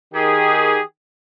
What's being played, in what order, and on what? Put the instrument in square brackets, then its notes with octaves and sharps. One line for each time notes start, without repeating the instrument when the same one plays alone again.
[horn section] D#3 G4 G#4